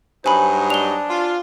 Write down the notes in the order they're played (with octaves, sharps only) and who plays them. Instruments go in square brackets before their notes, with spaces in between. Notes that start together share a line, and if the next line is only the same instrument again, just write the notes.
[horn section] G2 F#3 D#4 [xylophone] C5 G#5 B5
[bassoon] D4 [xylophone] F7 G7
[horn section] F4